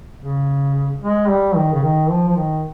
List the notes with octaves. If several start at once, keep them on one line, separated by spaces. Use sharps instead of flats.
C#3
G#3
G3
D#3
C#3
D#3
F3
F3
D#3